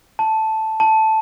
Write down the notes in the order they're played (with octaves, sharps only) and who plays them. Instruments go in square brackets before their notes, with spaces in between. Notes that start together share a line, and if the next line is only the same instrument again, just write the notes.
[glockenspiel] A5
A5